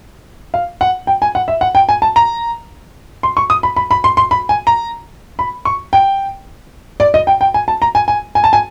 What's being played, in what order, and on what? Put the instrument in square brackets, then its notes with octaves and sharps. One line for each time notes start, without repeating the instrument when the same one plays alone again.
[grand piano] F5
F#5
G5
G#5
F#5
E5
F#5
G5
G#5
A5
A#5
C6
C#6
D#6
B5
B5
B5
C6
C6
B5
G#5
A#5
B5
C#6
G5
D5
D#5
G5
G5
G#5
A5
A#5
G#5
G#5
G#5
A5
G#5